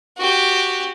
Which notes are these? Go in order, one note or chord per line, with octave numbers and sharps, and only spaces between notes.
F#4 G4